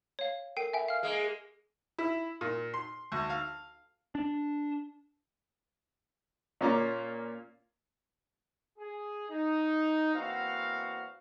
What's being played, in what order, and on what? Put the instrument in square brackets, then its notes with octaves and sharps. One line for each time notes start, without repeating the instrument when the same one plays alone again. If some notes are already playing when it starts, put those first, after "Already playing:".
[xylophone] C#5 F5
[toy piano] A4 A#4 [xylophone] G5 C7 D#7
[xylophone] E5 G5 [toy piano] G#5 B5
[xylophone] F5 F6
[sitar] G#3 A#3
[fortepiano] E4
A#2
C6
D2
F5
[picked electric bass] D4
[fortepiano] A#2 A#3 C#4 F4 A#5 D6
[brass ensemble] G#4
D#4
E2 A#3 C4 F#4 F5